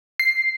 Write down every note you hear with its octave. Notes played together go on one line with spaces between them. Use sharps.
C7